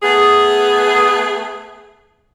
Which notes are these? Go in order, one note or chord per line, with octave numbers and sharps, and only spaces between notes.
A3 B3 G#4